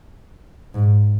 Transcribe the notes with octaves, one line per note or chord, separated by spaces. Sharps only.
G#2